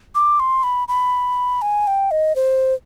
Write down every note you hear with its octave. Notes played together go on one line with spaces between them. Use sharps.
D6
C6
B5
B5
G#5
G5
D#5
C5